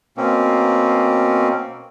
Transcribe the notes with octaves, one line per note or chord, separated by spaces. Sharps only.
B2 A#3 C4 C#4